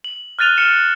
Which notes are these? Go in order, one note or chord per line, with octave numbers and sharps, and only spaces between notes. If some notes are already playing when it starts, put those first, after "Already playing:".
F#7
F6 F#6 A6 D#7 F7 G7
F6 C#7 E7